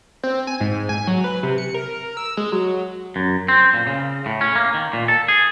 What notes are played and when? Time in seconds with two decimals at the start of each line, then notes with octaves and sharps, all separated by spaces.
0.23 C4
0.47 G#5
0.60 G#2
0.89 G#5
1.07 F#3
1.24 B4
1.43 C3
1.58 C#7
1.74 A#4
2.17 E6
2.37 G#3
2.52 F#3
3.16 F#2
3.48 C4
3.74 A#2
3.87 C#3
4.26 A2
4.41 C#4
4.55 A#3
4.74 D#3
4.93 A#2
5.08 A4
5.28 G#4